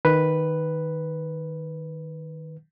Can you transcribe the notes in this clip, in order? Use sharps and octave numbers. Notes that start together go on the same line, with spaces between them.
D#3 B4